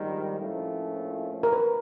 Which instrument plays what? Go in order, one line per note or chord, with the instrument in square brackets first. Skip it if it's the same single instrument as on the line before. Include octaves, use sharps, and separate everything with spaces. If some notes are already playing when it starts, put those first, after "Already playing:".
Already playing: [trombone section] A#1 G#2 D#3 G3
A#1 A2 F3 A3 C#4
[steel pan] A#4
B4